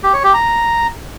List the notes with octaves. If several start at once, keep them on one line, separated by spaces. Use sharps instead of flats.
G4
C#5
G4
A#5